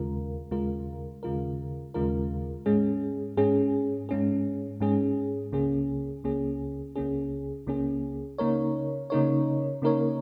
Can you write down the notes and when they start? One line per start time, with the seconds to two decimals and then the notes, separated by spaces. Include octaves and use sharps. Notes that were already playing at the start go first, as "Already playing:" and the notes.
Already playing: D#2 C#3 G#3 F4 A#4
0.51 D#2 C#3 G#3 F4 A#4
1.23 D#2 C#3 G#3 F4 A#4
1.94 D#2 C#3 G#3 F4 A#4
2.66 G#2 G#3 C#4 G#4
3.37 G#2 G#3 C#4 G#4
4.09 G#2 G#3 C#4 G#4
4.80 G#2 G#3 C#4 G#4
5.52 C#2 C#3 A#3 C#4 G#4
6.24 C#2 C#3 A#3 C#4 G#4
6.95 C#2 C#3 A#3 C#4 G#4
7.67 C#2 C#3 A#3 C#4 G#4
8.38 C#3 A#3 D#4 A#4 C#5
9.10 C#3 A#3 D#4 A#4 C#5
9.82 C#3 A#3 D#4 A#4 C#5